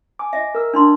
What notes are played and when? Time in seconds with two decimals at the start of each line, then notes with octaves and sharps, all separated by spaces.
0.19 G#5 D6
0.33 D#5 E5
0.55 A#4 E6
0.74 D4 D#4 C6